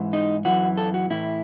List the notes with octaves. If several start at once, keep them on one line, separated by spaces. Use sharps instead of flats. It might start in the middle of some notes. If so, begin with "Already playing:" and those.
Already playing: G#2 E3
D#4
F#2 E3 F#4
A4
F#4
A2 E3 E4